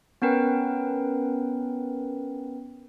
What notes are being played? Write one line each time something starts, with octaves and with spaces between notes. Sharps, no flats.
B3 C#4 A#4 B4 G5